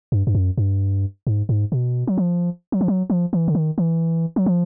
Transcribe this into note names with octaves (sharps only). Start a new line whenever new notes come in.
G2
G2
F#2
G2
G#2
G#2
B2
F#3
F3
F#3
F3
F#3
F3
E3
D3
D#3
E3
F#3
F3